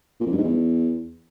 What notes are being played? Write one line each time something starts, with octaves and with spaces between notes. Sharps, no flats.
A#2
F2
G2
G#2
E2